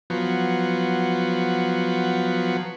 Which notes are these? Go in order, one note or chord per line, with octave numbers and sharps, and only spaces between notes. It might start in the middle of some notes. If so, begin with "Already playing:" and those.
F3 F#3 B3